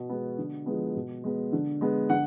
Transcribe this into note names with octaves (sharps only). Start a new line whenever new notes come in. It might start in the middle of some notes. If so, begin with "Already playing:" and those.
Already playing: B2
G#3 B3
D3
F3 G#3 B3
B2
G#3 B3
D3
G#3 B3
D3 F#5